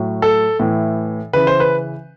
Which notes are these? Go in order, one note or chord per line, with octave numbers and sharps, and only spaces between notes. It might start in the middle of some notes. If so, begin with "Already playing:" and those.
Already playing: A2 F#3
A4
A2 E3
C#3 E3 B4
C5
B4